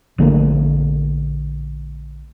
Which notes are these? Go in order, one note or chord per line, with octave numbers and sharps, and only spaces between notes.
A#1 D3 A3 A#3